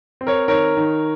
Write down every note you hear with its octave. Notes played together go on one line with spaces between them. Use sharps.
C4
A#4 C#5
D#3 A#4 C#5
D#3